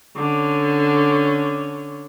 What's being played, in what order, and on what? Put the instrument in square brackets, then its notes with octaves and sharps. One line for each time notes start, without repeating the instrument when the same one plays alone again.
[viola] D3 C#4